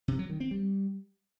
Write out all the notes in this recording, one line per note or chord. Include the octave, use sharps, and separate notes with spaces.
C3
F#3
D#3
C4
G3